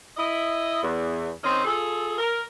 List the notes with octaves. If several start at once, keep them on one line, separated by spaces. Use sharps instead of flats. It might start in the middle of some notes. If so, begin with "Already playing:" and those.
E4 D#5
E2
D#3 C4 C#4 D#4
F4 G#4 A4
A#4